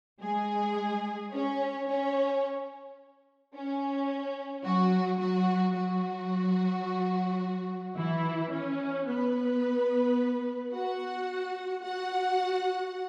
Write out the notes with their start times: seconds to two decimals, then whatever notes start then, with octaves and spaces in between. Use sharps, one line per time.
0.21 G#3 G#4
1.32 C#4 C#5
1.88 C#4 C#5
3.54 C#4
4.64 F#3 F#4
5.20 F#3 F#4
5.75 F#3 F#4
7.96 E3 E4
8.52 C#4
9.07 B3 B4
10.73 F#4 F#5
11.84 F#4 F#5